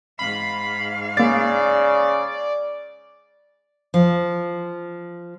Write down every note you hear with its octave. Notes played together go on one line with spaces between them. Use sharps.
G#2 F5 B5
C#3 A#3 D5 A6
F3